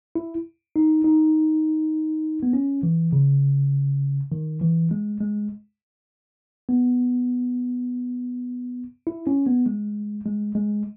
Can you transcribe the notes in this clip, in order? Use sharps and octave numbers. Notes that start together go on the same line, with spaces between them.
E4
D#4
D#4
B3
C#4
E3
C#3
D#3
E3
G#3
G#3
B3
E4
C#4
B3
G#3
G#3
G#3